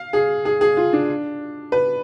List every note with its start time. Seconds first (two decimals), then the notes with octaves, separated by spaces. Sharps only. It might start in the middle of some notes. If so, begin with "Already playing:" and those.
Already playing: F5
0.13 G#4
0.45 G#4
0.61 G#4
0.77 F4
0.93 D4
1.72 B4